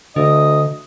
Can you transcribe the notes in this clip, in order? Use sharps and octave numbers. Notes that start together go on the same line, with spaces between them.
D2 D3 D#5